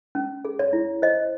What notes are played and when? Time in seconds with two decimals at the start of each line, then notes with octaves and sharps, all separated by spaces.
0.15 C#4
0.45 G#4
0.59 C#5
0.73 E4
1.02 C5 D#5